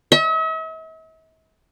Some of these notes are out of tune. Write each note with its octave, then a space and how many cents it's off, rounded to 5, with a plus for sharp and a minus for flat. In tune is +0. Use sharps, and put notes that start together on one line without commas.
E5 -45